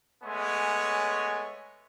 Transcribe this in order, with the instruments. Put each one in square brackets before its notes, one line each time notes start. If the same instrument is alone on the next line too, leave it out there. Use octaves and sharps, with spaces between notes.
[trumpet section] G#3 A3 B3 C#5 G#5